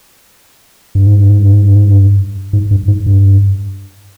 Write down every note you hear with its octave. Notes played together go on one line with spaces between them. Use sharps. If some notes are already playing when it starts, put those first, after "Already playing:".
G2
G#2
G2
G#2
G2
G#2
G2
G#2
G2
G#2
G2
G#2
G2